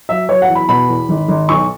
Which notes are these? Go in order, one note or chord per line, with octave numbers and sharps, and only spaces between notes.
F#3 E5
F#3 C#5
F#5
E2
B5
B2 B5
E2
G#1
G#1
B1 C#6